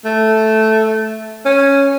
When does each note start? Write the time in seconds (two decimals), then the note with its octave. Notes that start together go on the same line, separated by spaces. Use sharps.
0.05 A3
1.45 C#4